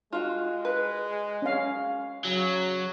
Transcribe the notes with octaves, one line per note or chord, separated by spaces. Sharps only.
G#3 F4 F#4
B4
C#4 F5
C#3 F#3